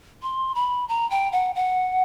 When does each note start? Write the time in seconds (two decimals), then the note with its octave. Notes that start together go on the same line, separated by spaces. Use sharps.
0.22 C6
0.55 B5
0.89 A#5
1.10 G5
1.32 F#5
1.55 F#5